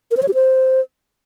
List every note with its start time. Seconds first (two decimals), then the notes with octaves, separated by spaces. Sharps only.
0.11 A#4
0.17 C5
0.23 C#5
0.28 G4
0.34 C5